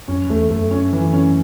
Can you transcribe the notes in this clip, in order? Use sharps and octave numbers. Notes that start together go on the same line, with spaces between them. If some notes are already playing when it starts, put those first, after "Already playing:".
F#2 C#4
E2 A3
F#2 A3
C#4
E3
C#4